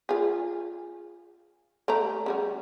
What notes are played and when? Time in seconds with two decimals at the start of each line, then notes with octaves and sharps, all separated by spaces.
0.09 F4 G#4
1.88 A3 G4 A#5
2.26 C#3 G3 F#4